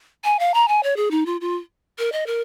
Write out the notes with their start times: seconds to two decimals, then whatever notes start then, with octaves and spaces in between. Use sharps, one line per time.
0.24 G#5
0.39 F5
0.54 A#5
0.68 G#5
0.83 C#5
0.96 G#4
1.11 D#4
1.26 F4
1.41 F4
1.98 A#4
2.12 D#5
2.26 A#4